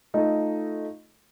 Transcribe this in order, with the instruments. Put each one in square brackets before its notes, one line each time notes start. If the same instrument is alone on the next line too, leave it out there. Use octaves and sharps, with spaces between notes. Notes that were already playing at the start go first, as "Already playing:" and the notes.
[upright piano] A3 D#4 F4 A4 D#5